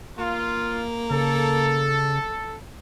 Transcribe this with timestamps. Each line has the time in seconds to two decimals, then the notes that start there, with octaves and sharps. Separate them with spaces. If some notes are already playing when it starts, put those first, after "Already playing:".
0.18 A#3 F4
1.11 C#3 A4